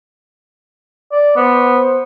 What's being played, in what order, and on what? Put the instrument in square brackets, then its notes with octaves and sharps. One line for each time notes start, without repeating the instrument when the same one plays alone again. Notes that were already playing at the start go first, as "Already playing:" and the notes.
[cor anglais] D5
[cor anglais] B3 [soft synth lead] C5